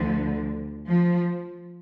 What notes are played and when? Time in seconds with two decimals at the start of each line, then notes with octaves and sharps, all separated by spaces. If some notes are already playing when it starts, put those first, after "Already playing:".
Already playing: D2 D3 F3
0.89 F3